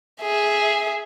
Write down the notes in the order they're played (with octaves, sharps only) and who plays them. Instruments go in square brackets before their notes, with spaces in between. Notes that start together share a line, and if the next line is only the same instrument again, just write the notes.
[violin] G#4 E5